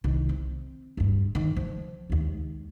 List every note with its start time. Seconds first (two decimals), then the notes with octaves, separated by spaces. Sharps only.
0.04 C2 D#3
0.29 C4
0.97 D1 G2
1.35 D#3
1.56 F3
2.10 D#2 G#3